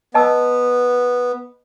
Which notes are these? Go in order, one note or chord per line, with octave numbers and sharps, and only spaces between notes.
B3 D#5 A5 E6